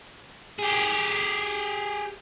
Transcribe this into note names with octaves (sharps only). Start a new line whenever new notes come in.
G4 G#4